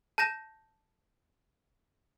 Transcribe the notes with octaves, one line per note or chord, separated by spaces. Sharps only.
A5 G6 A#6 E7